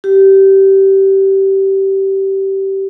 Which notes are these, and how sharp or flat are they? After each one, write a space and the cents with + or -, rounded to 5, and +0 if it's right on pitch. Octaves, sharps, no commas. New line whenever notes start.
G4 -20